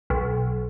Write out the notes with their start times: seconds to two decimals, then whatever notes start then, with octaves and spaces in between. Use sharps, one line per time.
0.10 B1